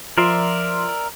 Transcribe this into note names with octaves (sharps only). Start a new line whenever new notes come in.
F3 A#4 D5 E5 C6